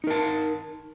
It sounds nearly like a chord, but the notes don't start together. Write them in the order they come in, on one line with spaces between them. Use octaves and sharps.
D#4 A#4 A5